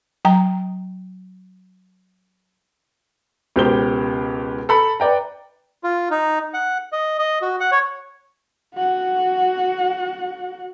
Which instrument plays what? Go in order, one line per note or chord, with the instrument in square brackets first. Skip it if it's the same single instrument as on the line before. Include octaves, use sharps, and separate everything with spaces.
[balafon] F#3 G5 A#5
[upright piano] C#2 B2 G4 A#4 C5 G7
A4 B5 C#7
B4 D5 G5 A#5
[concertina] F4
D#4
F#5
D#5
D#5
F#4
F#5
C#5
[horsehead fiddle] F#4 F#5